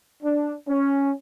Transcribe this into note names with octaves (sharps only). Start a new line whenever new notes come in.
D4
C#4